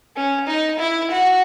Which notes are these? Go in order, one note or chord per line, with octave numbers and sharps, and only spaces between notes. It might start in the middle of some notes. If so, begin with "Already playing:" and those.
C#4
D#4
E4
F#4